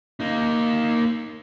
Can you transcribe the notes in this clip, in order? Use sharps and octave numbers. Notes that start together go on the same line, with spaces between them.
A#3 D#4